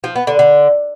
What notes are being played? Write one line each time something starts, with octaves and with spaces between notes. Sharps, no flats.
F3
B3
D3
D3